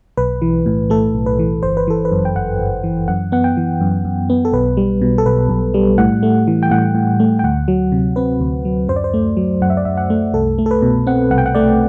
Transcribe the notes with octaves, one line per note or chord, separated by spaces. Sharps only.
B1 B4
E3
A2
A3 A4
B1
B4
E3
G1 C5
B4
E3 A4
B4
F#2
G5
G1 F#5
G1
E3
F#2 F#5
B3 F#5
G5
E3
F#2
F#2
B3
A4
B1 B4
G3
B2
A4
B1 B4
B1
G3
A2 F#5
A3
E3
G5
A2 F#5
A2
A3
G5
D2 F#5
F#3
C3
C4 B4
D2
F#3
F#2 C5
D5
C5
A3
F#3
F#2 F#5
E5
D5
F#2 E5
F#5
A3
C2 A4
A3
A4
B4
B2
C4 F#5
C2 F#5
G5
F#5
A3 D5